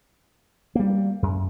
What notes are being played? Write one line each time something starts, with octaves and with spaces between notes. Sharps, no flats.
G3 A#3
F#2